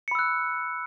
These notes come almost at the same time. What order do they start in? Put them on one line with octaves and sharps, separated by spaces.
C#7 B5 E6 F#6